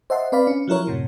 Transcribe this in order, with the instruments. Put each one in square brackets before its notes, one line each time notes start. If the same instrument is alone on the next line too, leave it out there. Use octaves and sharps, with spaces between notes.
[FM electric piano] C5 D#5 E5 F#5 A5 C6
C4 B4 D5 F5 B5
C#4
F3 F#3 E4 A#4 C#5
F#2 A2 C3